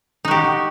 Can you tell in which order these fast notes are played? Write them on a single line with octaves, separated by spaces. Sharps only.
D#4 F#4 G4